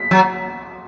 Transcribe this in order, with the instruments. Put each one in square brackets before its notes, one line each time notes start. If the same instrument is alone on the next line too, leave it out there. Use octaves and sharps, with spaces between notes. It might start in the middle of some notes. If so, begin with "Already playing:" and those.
Already playing: [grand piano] B6
[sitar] F#3